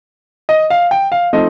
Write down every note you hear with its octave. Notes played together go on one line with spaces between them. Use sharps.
D#5
F5
G5
F5
F3 A3 C4 D#4 D#5